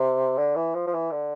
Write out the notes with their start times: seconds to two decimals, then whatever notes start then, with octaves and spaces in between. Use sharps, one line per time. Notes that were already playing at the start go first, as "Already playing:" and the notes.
Already playing: C3
0.38 D3
0.56 E3
0.75 F3
0.87 F3
0.94 E3
1.11 D3